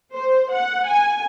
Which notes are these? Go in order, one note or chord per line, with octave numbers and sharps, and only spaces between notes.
C5
F#5
G#5